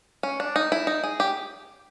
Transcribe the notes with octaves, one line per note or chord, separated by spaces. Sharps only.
C#4
D4
D#4
E4
D#4
G#4
G4